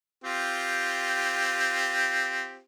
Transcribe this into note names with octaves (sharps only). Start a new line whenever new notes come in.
C4 F4 G4